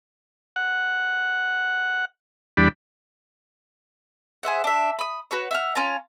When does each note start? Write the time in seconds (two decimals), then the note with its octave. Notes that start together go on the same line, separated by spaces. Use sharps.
0.56 F#5
2.57 E2 G3 D4 B5
4.43 G#4 C5 E5 F#5
4.64 D4 E5
4.99 B5 D#6
5.31 F#4 B4 C#5
5.51 E5 F#5 F6
5.75 C#4 F4 A5 A#5